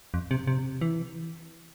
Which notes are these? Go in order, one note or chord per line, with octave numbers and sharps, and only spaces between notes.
F2
C3
C3
E3